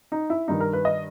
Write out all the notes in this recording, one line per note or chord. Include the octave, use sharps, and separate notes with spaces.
D#4
E4
G2 D#3 D#4
A#4
B4
D#5